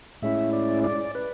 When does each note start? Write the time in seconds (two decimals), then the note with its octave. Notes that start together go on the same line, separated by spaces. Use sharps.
0.22 A2 G#3 C#4 E4 E5
0.53 D5
0.84 D5
1.15 B4